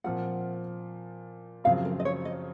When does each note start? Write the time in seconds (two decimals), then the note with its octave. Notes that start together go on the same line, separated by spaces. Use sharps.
0.04 A#2 F3 C4 F4 F#5
1.64 F#2 C#3 F3 C4 F4 F5
1.85 A#4
2.00 D#5
2.05 C#5
2.25 D#5